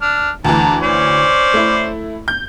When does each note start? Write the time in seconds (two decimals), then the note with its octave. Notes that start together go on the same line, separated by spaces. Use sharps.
0.02 D4 F6
0.45 D2 D3 E3 A5 A#5
0.83 C#4 C5 D5
1.54 A3 E4
2.28 G6